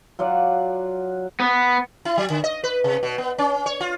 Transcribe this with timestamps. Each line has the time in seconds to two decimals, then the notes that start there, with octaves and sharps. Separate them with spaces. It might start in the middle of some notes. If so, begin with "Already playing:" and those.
0.19 F#3 F4 D5 F#5
1.40 B3
2.05 E4
2.18 F#3
2.30 D3
2.44 D#5
2.64 B4
2.84 C3
3.03 B2
3.18 B3
3.38 C#4
3.66 C#5
3.81 F4